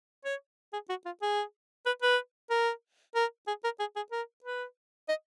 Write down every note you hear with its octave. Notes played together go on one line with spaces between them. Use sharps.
C#5
G#4
F#4
F4
G#4
B4
B4
A#4
A#4
G#4
A#4
G#4
G#4
A#4
B4
D#5